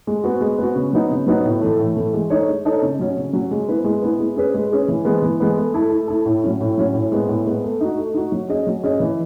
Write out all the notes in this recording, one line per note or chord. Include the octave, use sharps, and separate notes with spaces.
G#3
B3 F#4
G#3
B3 F#4
C#3
F#3 B3 D#4
C#3
F#3 B3 D#4
A2
E3 A3
A2
E3 A3
G#3
D#4 A4 C#5
G#3
D#4 A4 C#5
C#3
F#3 C#4
C#3
F#3 C#4
G#3
B3 E4 B4
G#3
B3 E4 B4
G#3
C#4 G#4 B4
G#3
C#4 G#4 B4
E3
G#3 B3
E3
G#3 B3
A3
E4 A4
A3
E4 A4
A2
F#3 C#4
A2
F#3 C#4
A2
G#3 B3
A2
G#3 B3
A3
D#4 F#4
A3
D#4 F#4
F#3
C#4 G#4 D#5
F#3
C#4 G#4 D#5
E3